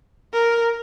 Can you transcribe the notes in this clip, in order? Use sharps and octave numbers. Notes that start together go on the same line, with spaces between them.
A#4